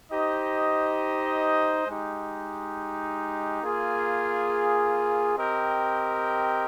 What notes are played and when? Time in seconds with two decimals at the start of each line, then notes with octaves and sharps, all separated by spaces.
0.12 D#4 G4 C5 D#5
1.87 G#3 D#4 G4
3.62 A#3 F4 G#4
5.37 C4 G4 A#4 D#5 G5